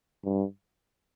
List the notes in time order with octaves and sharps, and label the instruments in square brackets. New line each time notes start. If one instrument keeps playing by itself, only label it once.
[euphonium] G2